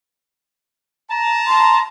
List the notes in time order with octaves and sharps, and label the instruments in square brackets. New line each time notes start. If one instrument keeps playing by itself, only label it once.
[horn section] A5 A#5
[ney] C6